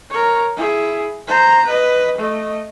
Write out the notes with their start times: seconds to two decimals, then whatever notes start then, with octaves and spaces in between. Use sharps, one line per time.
0.11 A#4 C#5
0.57 E4 G#4
1.28 C5 A#5
1.66 B4 D#5
2.18 A3 D#5